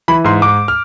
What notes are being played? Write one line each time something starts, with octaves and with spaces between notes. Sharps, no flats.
E3 B5
G#2 C6
G#2 D6
F6